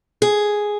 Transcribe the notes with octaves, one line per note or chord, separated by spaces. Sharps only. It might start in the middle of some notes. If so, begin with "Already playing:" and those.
G#4